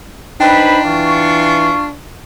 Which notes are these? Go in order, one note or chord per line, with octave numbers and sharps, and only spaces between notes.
D4 D#4 B4 C5 G5 B5
E3 F4 C#6